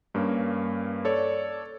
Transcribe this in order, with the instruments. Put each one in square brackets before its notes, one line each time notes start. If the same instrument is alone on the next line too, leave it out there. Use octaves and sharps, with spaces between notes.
[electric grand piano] G2 A#3 C#4
A4 C#5 D5